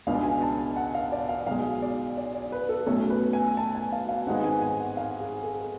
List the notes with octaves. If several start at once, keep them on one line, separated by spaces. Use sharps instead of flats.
C#2 B2 G#3 D4 F5
G#5
A5
F#5
F5
D5
F5
B1 B2 G#3 F5
D5
D5
D5
B4
A4
B1 B2 A3 C#4 A4
B4
G#5
A5
G#5
F5
F5
G#1 G#2 G#3 B3 F#5
G#5
G#5
F#5
F5
G#4
A4